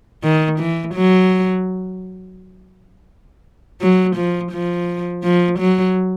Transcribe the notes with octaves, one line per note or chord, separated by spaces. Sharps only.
D#3
E3
F#3
F#3
F3
F3
F3
F#3